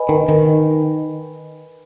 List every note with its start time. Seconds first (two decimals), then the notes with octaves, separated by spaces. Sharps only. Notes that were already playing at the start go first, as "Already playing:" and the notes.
Already playing: B4 D#5 G#5 B5
0.09 D#3
0.28 D#3